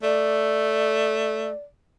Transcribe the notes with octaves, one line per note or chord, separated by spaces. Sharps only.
A3 D5